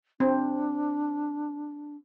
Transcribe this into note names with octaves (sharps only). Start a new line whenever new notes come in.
C4 D4